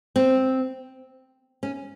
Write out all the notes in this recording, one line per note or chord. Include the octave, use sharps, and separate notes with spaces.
C4
C#4